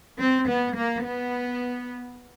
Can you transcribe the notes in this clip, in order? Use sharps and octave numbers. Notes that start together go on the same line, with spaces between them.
C4
B3
A#3
B3